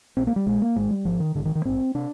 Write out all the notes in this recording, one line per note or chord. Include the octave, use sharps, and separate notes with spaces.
A#1 A#2 C4
A#3
G3
A#1 A#2 G#3
A#3
G#1 G#2 G#3
G3
G#1 G#2 F3
D#3
A#1 G#2 D3
D#3
D#3
A#1 G#2 C4
C3 D4